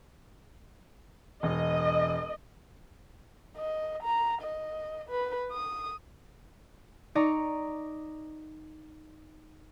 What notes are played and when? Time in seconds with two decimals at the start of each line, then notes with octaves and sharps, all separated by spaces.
1.43 E1 D#5
3.57 D#5
4.03 A#5
4.41 D#5
5.09 B4
5.52 D#6
7.15 D#4 D5 A#5 C#6